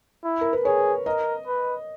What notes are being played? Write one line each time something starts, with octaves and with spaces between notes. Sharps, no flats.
E4
A#4
B4
G#4 C#5
A#4 D#5
B4